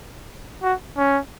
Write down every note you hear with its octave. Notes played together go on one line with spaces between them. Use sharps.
F#4
C#4